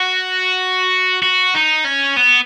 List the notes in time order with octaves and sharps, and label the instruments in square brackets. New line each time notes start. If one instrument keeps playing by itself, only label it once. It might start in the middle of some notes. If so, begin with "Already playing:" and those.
Already playing: [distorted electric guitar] F#4
F#4
D#4
C#4
B3